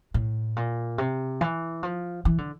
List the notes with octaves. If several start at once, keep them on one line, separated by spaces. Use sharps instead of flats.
A2
A#2
C3
E3
F3
E3
D3